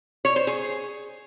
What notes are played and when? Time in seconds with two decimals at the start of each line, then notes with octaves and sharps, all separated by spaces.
0.25 C#5
0.36 C5
0.47 G#4